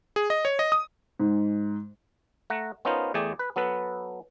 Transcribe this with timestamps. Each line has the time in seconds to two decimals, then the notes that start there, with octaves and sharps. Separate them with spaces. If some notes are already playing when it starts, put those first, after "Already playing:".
0.16 G#4
0.30 D#5
0.45 C#5
0.59 D#5
0.72 D#6
1.20 G#2
2.50 A3 F#5 A#5
2.85 B3 C#4 D#4 F4 A#4 C5
3.14 E2 A3 G#4 D5 G5
3.39 B4
3.56 F#3 B3 A4 B4